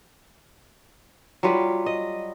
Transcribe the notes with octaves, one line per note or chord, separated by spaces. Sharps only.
F#3 G3 F4 B4
D#5